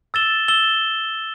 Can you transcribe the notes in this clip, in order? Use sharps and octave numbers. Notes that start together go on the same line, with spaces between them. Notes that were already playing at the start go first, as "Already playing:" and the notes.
E6 A6 E7 G7
E6 A6 E7 G7